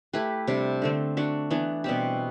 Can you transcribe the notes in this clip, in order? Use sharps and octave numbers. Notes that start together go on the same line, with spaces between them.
A3 E4 G4 B4
C3 G3 D4
D3 A3 C4
A3 D4 F#4
E3 B3 D4
B2 G3 C4 G4